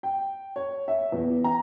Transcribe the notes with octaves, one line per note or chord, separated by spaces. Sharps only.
G5
C#5
E5
E2
A#5